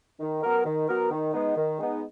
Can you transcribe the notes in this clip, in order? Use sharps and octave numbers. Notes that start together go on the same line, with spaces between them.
D#3
F#3 B3 F#4 A#4
D#3
F#3 B3 F#4 A#4
D#3
G#3 B3 D#4
D#3
G#3 B3 D#4